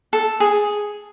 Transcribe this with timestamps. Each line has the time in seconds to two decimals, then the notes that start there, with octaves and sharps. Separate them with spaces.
0.13 A4
0.40 G#4